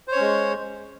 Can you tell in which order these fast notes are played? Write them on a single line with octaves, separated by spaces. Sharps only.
C5 C#5 C#4 G#3